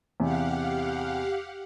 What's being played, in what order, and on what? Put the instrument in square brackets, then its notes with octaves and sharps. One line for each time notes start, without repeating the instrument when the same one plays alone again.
[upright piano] E2 C3 [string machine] G4 F5 F#5